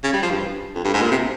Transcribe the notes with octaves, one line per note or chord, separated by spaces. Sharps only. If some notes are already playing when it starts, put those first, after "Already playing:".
C#3
G3
F3
G2
F2
G2
G#2
A#2
C3